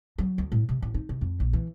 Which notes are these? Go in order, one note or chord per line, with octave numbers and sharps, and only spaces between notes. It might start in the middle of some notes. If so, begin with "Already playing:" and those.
F#3
D2
A2
C3
A1
D#4
C3
F2
A#1
E3